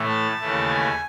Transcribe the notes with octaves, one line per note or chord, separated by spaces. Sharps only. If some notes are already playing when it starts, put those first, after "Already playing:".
Already playing: A2 E3 A3
A5
D#2 C#3 E3 A3
G#5